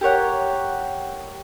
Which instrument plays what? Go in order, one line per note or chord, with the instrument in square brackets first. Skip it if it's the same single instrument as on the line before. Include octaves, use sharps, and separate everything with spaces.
[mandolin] G4 A#4 C#5 F#5